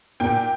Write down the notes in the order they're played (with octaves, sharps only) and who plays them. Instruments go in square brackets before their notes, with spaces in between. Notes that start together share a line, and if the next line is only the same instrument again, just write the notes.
[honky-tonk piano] A#2 G5